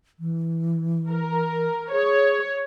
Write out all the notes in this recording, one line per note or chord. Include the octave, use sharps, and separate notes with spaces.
E3
A#4
G#4 C#5